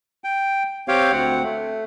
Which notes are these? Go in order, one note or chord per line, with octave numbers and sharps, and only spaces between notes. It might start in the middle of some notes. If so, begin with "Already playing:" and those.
G5
C4 G4 C#5 F5 G5
D2 C4 F#5
A3